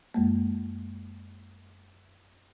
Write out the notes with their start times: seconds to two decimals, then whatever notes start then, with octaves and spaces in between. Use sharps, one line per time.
0.14 F#2 G#3 A#3